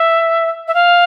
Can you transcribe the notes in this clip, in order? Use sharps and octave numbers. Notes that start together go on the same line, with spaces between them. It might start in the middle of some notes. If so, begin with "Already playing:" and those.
Already playing: E5
E5
F5